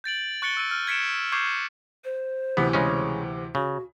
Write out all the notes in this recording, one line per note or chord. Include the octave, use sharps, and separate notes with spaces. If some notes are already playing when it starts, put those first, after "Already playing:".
G6 A6 D7 F#7
C#6 F#6 A6 C#7 D7 G7
E6 F#6 D#7
F6
G#6 B6 C#7 D7 E7
C#6 D6 G6 G#6 C7 D#7
C5
D2 C3 E3 B3
C#3 G#3 C#4
C#3 F#4